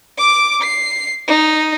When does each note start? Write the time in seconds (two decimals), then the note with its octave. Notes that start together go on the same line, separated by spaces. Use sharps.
0.18 D6 D7
0.61 C7
1.28 D#4